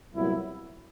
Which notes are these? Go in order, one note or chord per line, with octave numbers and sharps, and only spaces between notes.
C2 A#2 F#3 B3 E4